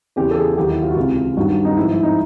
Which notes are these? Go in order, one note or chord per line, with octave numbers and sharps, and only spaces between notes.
E2 C#3 E3 G4
A4
G#4
D#2 D#3 F#3 G4
E4
F4
F#4
C#2 C3 E3 F4
F4
G2 D#3 F#3 F#4
D#4
G#2 F3 E4
E4
D#4